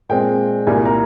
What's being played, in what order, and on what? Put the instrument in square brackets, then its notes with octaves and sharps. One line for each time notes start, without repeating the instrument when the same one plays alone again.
[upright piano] A#2 G#3 C4 G5
C2 A#2 G3 A#3 G#5
A#5